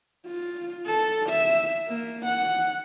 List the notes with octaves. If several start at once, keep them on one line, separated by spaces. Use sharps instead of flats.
F4
A4
E5
A#3
F#5